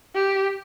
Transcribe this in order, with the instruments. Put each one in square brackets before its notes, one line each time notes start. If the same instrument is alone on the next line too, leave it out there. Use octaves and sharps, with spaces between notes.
[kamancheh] G4